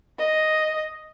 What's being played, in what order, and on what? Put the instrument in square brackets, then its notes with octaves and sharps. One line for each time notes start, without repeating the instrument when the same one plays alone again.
[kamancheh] D#5